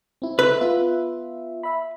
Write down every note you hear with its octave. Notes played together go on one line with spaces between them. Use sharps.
C4 E4
A4 B4 E5
B3 F4 E5
E5 B5